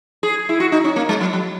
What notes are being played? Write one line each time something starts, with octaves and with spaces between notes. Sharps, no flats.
G#4
E4
F#4
D#4
C#4
A#3
G#3
F#3
F#3